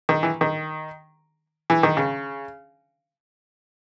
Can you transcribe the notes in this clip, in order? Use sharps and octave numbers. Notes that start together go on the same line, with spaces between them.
D#3
E3
D#3
E3
D#3
C#3